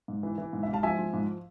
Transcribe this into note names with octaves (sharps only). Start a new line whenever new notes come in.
G#2
E3
E3
G#2
E5
G#2
F5 A5
F3 E5 G#5
F3
G#2